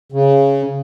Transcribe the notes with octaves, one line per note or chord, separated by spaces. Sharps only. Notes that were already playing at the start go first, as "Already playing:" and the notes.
C#3